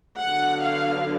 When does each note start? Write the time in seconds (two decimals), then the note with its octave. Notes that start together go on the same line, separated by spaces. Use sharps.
0.20 D3 F#3 B3 F#5
0.59 F5